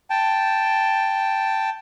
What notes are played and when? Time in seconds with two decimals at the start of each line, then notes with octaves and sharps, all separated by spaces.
0.10 G5 A5